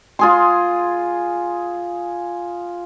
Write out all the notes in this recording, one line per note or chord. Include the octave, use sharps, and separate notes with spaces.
F4 G#4 C6